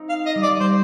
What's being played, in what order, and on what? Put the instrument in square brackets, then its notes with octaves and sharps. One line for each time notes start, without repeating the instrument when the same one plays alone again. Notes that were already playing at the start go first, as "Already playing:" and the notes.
Already playing: [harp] C4 D#4
[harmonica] F5
D#5
[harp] G3
[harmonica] D5
[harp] G3 [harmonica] C5